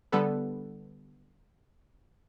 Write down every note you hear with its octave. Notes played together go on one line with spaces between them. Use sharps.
D3 G3 B3 A4 B4